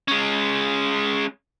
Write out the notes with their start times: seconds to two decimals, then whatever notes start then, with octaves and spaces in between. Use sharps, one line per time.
0.08 G#3 C#4